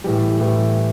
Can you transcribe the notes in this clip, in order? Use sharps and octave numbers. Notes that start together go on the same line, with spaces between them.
A2 E3 G3
A2 E3 G3